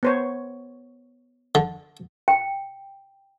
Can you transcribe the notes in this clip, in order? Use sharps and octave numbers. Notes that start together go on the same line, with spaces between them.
B3 C5 C#5
D3
G5